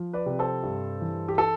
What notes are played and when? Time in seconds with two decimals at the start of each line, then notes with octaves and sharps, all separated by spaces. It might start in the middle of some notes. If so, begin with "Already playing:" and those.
Already playing: F3
0.13 B4 D5
0.26 C3
0.39 A4 C5
0.63 G2
1.01 E3
1.28 G4
1.38 A4